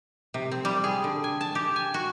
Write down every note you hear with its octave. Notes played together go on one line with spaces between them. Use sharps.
C3
C4
G3
G#4
D3
G#5
A5
G4
G#5
F#4